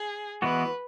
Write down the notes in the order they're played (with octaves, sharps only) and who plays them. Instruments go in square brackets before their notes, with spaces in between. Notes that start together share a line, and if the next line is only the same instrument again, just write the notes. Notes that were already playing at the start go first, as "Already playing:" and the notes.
Already playing: [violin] G#4
[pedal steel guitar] E3 G#3 B3 F#4 [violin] B4